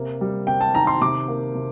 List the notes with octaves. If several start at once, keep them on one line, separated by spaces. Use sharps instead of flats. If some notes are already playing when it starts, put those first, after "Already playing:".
Already playing: C3 A#3
G3
C3 G5
A5
D#3 A#5
C6
C3 D6
A#3
C3